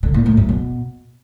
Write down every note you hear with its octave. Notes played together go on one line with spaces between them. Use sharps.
D3
A#2
A2
F#2
B2